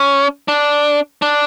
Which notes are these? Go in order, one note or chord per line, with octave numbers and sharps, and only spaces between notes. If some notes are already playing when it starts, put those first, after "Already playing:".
Already playing: C#4
D4
D4